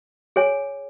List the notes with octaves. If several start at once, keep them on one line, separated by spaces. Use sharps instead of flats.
G#4 C#5 G#5